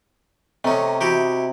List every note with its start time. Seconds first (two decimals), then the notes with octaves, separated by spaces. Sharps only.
0.64 C3 A3 C#4 D#5 A#5
1.01 E4 F#4 G4